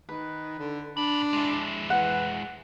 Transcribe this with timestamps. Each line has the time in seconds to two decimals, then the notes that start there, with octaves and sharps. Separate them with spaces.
0.09 D#3 B4
0.59 D3
0.97 A#2 D4 B5
1.33 G#3 E4
1.90 E3 F#5